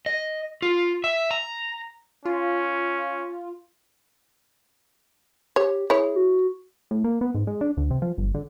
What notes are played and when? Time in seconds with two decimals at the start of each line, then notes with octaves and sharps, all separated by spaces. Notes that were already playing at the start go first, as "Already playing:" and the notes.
0.06 D#5
0.62 F4
1.04 E5
1.31 A#5
2.25 C#4 F4
5.56 G4 C#5
5.90 E4 G#4 C#5
6.16 F#4
6.91 A2
7.04 A#3
7.21 B3
7.35 G#2
7.47 G#3
7.61 D4
7.77 D2
7.91 C3
8.02 F3
8.18 G1
8.35 D3